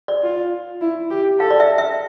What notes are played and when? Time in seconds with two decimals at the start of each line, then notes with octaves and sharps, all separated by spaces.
0.08 D5
0.23 F4
0.81 E4
1.10 G4
1.40 A4 F5
1.50 D5
1.60 E5
1.78 E5